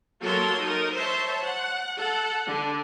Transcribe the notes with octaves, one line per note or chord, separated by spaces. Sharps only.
F#3 A#3 A4 A#4 C6
D#4 A#4
C5 C#5 E5 A5 C6
F#5
A4 F#5
D3